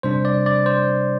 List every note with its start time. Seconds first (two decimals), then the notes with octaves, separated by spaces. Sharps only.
0.03 C3 G3 D4 C5
0.25 D5
0.46 D5
0.66 C5